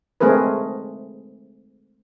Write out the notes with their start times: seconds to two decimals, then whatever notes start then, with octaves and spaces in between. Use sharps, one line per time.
0.21 G#3 A3 C4 G#4 A#4 B4